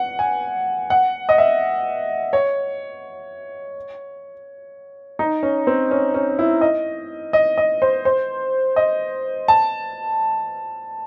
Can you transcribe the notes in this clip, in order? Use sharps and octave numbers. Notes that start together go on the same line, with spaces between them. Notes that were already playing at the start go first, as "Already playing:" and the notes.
Already playing: F#5
G#5
F#5
D#5
E5
C#5
D#4
C#4
C4
C#4
C#4
E4
D#5
D#5
D#5
C5
C5
D#5
A5